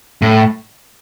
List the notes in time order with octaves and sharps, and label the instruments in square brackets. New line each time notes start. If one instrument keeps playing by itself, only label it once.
[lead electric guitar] A2